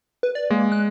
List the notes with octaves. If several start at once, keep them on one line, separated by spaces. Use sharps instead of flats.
B4
D5
G#3 A#3
F#6